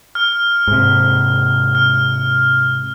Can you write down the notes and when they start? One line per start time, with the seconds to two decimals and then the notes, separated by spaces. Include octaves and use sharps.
0.15 F6
0.68 G#2 C3
1.75 F6